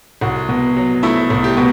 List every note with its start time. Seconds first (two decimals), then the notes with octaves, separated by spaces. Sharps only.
0.21 C2 F#4
0.49 B2
0.77 F#3
1.03 A3 E4
1.30 C2
1.44 G4
1.57 B2